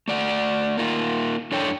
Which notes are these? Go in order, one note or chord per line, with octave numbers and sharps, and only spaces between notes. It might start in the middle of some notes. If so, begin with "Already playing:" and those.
A3 D5 F#5
A#3 D#4 F4
F#2 D4 A4 C#5 G5